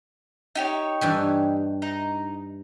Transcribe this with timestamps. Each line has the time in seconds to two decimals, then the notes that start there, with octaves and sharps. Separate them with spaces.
0.55 D#4 G4 C#5
1.01 G2 E3 G3
1.82 D#4